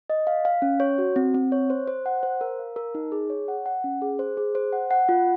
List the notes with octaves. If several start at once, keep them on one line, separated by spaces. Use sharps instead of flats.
D#5
F5
F5
C#4
C#5
F#4
C4
C4
C#5
C5
C5
F#5
C5
A#4
F5
A#4
D#4
G#4
C#5
F#5
F#5
C#4
G#4
C5
G#4
C5
F#5
F#5
F4